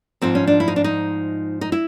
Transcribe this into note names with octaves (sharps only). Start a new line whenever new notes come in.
G#2 F3 C4
C#4
D4
E4
D#4
D4
D#4
D#4
E4